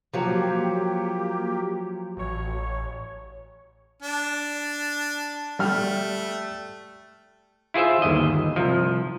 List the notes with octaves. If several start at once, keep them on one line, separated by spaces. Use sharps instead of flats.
F3 F#3 A#3 G4
A1 C#5
D4
G3 A3 F6
E4 F4 G#4 C5 E5
G1 D#2 D#5
C2 F3